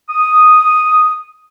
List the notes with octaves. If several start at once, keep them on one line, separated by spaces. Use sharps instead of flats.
D#6